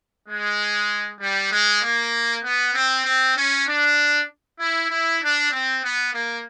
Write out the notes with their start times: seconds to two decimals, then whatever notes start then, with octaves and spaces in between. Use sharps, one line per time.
0.28 G#3
1.21 G3
1.52 G#3
1.83 A#3
2.44 B3
2.75 C4
3.06 C4
3.37 C#4
3.67 D4
4.59 E4
4.90 E4
5.22 D4
5.51 C4
5.83 B3
6.14 A#3